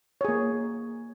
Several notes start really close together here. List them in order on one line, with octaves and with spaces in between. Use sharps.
C#5 G#4 A#3